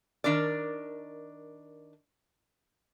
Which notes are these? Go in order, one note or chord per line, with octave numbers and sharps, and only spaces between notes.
D#3 D4 A#4 D5